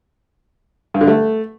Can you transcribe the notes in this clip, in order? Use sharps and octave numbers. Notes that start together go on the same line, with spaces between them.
G2
D3
A3